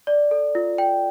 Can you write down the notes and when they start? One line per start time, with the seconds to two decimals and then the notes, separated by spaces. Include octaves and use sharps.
0.07 D5
0.31 A4
0.55 F4
0.78 G5